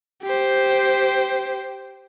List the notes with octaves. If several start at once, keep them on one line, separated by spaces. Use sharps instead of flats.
G4 C5